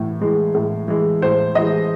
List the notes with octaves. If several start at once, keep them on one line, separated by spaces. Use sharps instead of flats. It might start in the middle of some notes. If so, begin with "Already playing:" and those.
Already playing: A2 E3
E3 G#3
A2
E3 G#3
A2 C5
E3 G#3 D#5